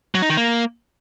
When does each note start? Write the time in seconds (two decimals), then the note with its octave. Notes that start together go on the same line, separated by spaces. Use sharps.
0.15 F#3
0.22 D#4
0.30 D#3
0.37 A#3